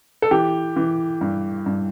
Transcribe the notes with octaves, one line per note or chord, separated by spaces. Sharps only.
A4
E3 G4
E3
G2
G2